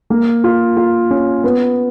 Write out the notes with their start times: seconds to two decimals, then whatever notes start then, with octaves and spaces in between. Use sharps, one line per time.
0.10 A#3
0.44 F4
0.77 F4
1.11 C#4
1.44 B3